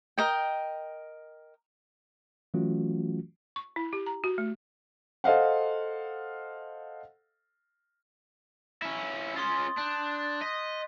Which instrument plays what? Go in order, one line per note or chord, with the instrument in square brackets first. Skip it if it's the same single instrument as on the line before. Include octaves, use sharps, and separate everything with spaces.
[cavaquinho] A#4 D#5 G5
[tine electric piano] E3 F#3 A3 C#4 F4 F#4
[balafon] C#6
E4
G4
A#5
F#4
A3
[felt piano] A4 C5 D#5 F5 F#5
[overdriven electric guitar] C#4 E4
[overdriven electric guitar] C#4 F4 [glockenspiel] C6 D#6 A6
[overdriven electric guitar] D4 [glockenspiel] F#6 G6
[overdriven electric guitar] D#5 [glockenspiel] B6